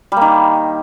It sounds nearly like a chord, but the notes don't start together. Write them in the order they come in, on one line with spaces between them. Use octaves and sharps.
G3 A#3 D#3